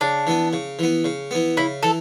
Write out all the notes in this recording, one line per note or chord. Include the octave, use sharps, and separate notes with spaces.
C#3 D4
E3 B3
C#3
E3 B3
C#3
E3 B3
C#3 E4
E3 A4